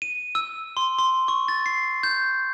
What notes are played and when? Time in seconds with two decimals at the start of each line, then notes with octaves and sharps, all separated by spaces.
0.02 D#7
0.35 E6
0.77 C6
0.98 C6
1.28 C#6
1.48 A6
1.66 C7
2.03 G6